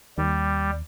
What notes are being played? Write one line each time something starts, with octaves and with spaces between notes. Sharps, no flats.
D#2 G3